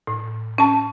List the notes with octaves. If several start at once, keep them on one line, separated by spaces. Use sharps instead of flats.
A2
C#4 A5